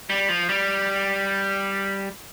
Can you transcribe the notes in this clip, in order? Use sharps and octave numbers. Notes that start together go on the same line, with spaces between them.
G3
F3
G3